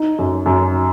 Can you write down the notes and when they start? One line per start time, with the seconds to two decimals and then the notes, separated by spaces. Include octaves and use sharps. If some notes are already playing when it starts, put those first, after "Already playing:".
Already playing: D#4
0.19 F#2
0.46 F#2